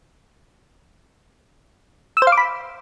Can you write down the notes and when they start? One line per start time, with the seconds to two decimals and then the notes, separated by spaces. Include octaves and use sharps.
2.17 E6
2.22 C5
2.27 F5
2.32 D6
2.37 B5